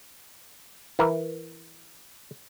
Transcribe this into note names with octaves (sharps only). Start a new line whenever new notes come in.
E3 A#4